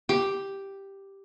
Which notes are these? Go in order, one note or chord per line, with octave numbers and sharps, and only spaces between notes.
G4